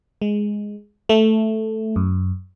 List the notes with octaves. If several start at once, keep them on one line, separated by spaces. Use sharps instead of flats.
G#3
A3
F#2